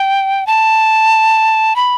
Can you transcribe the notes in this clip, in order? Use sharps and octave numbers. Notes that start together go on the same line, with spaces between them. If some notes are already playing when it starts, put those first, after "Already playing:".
Already playing: G5
A5
B5